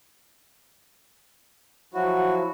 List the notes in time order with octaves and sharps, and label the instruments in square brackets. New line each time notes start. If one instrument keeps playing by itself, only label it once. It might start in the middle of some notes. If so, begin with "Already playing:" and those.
[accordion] F3 F#3 E4 [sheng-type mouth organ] F#4